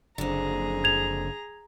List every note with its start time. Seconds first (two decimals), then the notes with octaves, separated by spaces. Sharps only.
0.18 F#1 F2 D3 G#4 A#5
0.84 G#6 F7